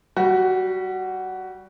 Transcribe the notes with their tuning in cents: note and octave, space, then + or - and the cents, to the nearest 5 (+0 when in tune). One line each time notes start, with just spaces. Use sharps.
G3 -15 F#4 +10